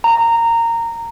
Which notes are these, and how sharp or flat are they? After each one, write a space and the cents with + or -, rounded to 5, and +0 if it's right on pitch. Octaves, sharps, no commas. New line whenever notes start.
A#5 -15